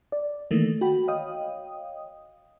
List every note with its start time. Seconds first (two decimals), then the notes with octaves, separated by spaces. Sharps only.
0.12 D5
0.51 D#3 E3 A3 A#3
0.81 F#4 G5 B5
1.08 C#5 D#5 F5 G5 D#6